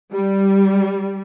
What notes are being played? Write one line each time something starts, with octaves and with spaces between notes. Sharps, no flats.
G3